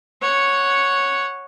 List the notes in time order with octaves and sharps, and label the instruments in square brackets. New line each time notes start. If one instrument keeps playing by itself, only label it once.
[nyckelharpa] C#5 F#5